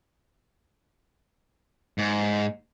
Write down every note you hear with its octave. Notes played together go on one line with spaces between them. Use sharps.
G#2